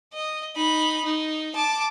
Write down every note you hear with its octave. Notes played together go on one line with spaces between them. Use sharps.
D#5
D#4 B5
D#4
A5 D6